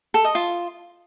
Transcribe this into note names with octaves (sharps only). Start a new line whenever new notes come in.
A4
D#5
F4